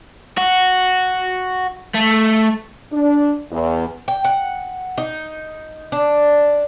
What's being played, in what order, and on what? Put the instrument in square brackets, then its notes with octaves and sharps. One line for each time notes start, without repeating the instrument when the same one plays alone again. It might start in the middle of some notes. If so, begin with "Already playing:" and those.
[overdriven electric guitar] F#4
A3
[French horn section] D4
E2
[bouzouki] G5
F#5
D#4
D4